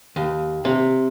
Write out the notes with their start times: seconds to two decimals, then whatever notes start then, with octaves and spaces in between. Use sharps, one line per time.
0.16 D#2
0.65 C3